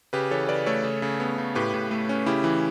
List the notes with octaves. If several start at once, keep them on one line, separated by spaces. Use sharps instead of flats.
C#3 G4 B4
E3 A4 C#5
C#3 B4 D5
A3 A4 C#5
C#3
C#3
B3
C#3
A2 G4 B4
A2
A3
C#4
C#3 E4 G4
E3